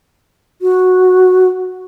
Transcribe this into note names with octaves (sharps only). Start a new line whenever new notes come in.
F#4